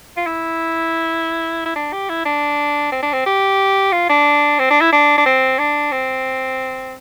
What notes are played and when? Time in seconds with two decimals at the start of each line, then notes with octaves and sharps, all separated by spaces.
0.17 F4
0.26 E4
1.66 E4
1.76 D4
1.93 G4
2.09 E4
2.25 D4
2.92 C4
3.02 D4
3.13 C4
3.26 G4
3.92 F4
4.10 D4
4.59 C4
4.70 D4
4.80 E4
4.93 D4
5.18 D4
5.26 C4
5.58 D4
5.92 C4